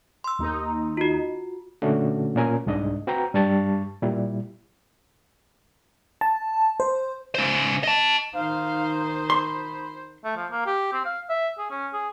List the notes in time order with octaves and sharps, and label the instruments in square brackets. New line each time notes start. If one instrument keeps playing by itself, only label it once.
[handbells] C6 E6
[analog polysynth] D#2 D#4
[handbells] F4 F#4
[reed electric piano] A#2 D3 A3 C#4 F#4 A4
A#2 C#4 A#4 G#5
C2 G#2 D4 D#5
C4 F#4 B4 G5 A#5
G2 G3 A5 C#6 A6
A#2 G3 E4
[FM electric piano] A5
C5
[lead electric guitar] C#3 C5
D#5 A5
[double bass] D#3 D#4 [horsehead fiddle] C5 [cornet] F5
[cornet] B5 [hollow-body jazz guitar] C6
[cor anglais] A3
F3
A#3
G4
C4
F5
E5
G#4
C#4
G#4